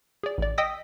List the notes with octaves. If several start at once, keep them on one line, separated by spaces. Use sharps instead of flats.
G#4 D5
A1 D5
D#5 G5 D#6 E6 A#6 B6